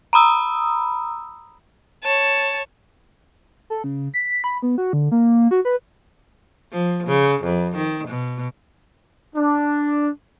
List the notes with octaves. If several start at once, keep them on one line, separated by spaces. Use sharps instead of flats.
A#5 B5 D#6 E6
C#5 A5
A4
C#3
B6
B5
B3
F#4
D3
A#3
F#4
B4
F3
C#3
F2
D#3
B2
D4